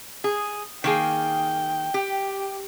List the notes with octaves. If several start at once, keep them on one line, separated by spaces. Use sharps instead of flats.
G#4
D#3 A#3 G#4 G5
G4